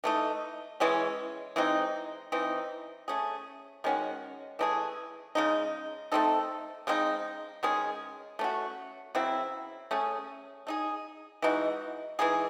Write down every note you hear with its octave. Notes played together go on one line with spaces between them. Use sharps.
E3 A3 D#4
E3 G#3 C#4
E3 G#3 C4 D#4
E3 C4 D#4
A3 C#4 G#4
D#3 G#3 C#4 F#4
E3 A3 D#4 G#4
C#3 G#3 D#4
A3 C4 D#4 A4
C#3 G#3 C4 D#4
D#3 G#3 C#4 G#4
A3 C#4 F#4
C#3 F#3 C4 E4
A3 C#4 G#4
A3 D#4 G#4
E3 G#3 D#4 F#4
E3 G#3 D#4 G#4